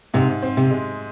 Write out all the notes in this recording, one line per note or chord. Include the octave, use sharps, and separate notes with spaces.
G#2 C3
C4
C3
G#3